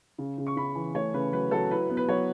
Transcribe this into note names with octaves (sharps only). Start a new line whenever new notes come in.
C#3
C#3
C#6
C#3 B5
E3
A3 C#5
C#3 B4
F#3 B4
F#3 A4
E4 B4
B3
B4
F#3 C#5